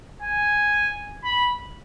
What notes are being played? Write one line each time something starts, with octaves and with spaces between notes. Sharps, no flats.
G#5
B5